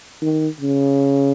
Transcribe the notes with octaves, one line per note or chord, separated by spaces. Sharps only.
D#3
C#3